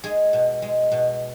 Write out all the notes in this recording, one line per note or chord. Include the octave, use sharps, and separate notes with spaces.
G#3 G#4
B2
G#3
B2